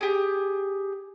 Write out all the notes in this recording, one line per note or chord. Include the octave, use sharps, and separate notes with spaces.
G4 G#4